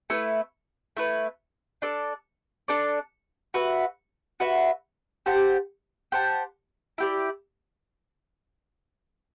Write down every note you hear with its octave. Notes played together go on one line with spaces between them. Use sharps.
A3 E4 B4
A3 E4 B4
D4 A4 D5
D4 A4 D5
F#4 B4 E5
F#4 B4 E5
G4 C5 F#5 A5
G4 C5 F#5 A5
E4 G4 D5